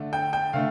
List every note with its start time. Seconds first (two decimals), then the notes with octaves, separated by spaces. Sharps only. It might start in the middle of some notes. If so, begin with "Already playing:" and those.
Already playing: D3 A3 D4
0.13 G5
0.33 G5
0.53 D3 A3 F5